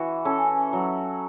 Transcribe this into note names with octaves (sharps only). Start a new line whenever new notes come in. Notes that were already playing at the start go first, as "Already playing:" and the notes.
Already playing: E3 F#4
C#4 A4
F#3